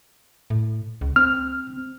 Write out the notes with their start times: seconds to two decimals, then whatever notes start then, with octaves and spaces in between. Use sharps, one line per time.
0.50 A2
1.01 C#2
1.16 C4 F6